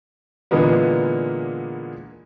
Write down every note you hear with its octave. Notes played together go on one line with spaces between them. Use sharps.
A#2 D3 E3 G#3 A#3 B3